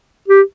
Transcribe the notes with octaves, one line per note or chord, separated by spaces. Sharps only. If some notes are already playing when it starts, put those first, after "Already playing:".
G4